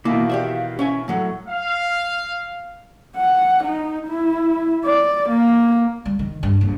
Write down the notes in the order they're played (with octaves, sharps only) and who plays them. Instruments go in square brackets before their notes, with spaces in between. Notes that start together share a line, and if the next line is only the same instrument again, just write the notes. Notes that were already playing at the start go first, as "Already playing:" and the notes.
[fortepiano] B2 D#3 E3 [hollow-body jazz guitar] A#3 E4 [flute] F5
[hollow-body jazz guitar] G4 D5 E5
C#4 E5 G#5
[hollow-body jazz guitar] A2 F#3 A3 [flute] F#5
[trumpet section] F5
[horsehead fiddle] F#5
D#4
E4
D5
A#3
[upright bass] G3
D#3
G2
A#1